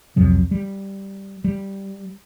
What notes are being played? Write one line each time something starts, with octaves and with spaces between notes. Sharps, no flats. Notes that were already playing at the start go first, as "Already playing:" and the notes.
C2 F2 C3 F#3
G3
G3